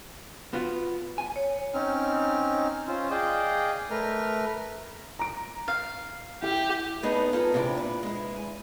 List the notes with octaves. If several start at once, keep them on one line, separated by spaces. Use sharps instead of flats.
B3 F4 F#4
G#5
C#5
C4 C#4 D#4 F6
C#4 F4 C5
G#4 D5 D#5 F5 G5
A3 A#4 B4 F6
A#5 D7
F5
E4 G4
A3 B3 D#4 G#4 A4 B4
F4 G#4 A4 A5 A#5
E2 G#2 C3 C4 D4 E4
A#2 B4
G#3 E4
G#5